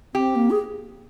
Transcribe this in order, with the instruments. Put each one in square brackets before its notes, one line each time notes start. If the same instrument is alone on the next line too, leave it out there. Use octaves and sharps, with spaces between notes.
[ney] C4 [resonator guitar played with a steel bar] G4
[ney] A#3
G#4